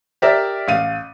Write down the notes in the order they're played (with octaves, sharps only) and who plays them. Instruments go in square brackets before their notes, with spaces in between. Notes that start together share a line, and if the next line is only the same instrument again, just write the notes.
[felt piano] G4 A#4 D5 E5
A1 F5 D#7